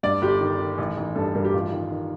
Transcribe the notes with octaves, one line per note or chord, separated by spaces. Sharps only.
G2 D5
G1 G4
D#3
D#3
A1
A1
G2 A4
A4
G2 A#4
G4
A1 F4
D#3
D#3